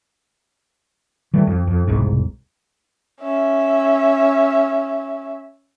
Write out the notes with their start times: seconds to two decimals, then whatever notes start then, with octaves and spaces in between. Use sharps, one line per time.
1.34 D#3 E3 G3 A3
1.47 F2
1.67 F2
1.87 E1 C2 G#2
3.21 C#4 E5